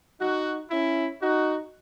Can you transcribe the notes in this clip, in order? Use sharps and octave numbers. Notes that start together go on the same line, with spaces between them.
D#4 F#4
C#4 E4
D#4 F#4